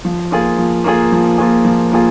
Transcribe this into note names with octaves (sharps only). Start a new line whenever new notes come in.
F3
A#3 F4 G#4
F3
A#3 F4 G#4
F3
A#3 F4 G#4
F3
A#3 F4 G#4